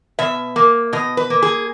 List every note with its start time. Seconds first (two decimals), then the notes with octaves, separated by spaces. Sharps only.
0.19 B2 E5
0.56 A#3
0.93 B2 D#5
1.17 B4
1.30 A#3
1.42 G#4